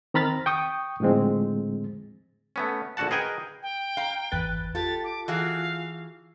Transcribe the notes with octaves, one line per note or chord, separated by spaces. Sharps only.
D#3 C4 A#5 B5 F6 A6
G5 C#6 D#6
A2 D3 F3 G#3 C4
A3 B3 C#4
A#1 D3 F#4 F#5 A5
G#4 A#4 B4 D#5 G5 G#5
G5
F5 A#5
G#1 E2 B4 A6
F4 G4 A4 A6
D6
E3 F#4 G#4 F5